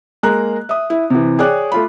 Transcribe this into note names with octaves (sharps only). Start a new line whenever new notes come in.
G#3 A#3 A#5 F#6
E5 D#6
E4
C3 E3
G#4 C#5 D5 G5 D6 F#6
A3 F4 B5